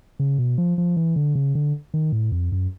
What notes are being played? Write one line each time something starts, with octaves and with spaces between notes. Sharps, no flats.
C#3
B2
F3
F3
E3
D3
C#3
D3
D#3
A2
F2
F#2